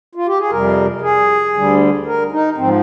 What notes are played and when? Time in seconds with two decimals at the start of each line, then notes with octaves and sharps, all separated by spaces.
0.15 F4
0.27 G4
0.39 G#4
0.50 F2 C3 G3 A#4
1.02 G#4
1.53 D2 D3 G3
2.05 A#4
2.32 D#4
2.57 G#2 F3 C4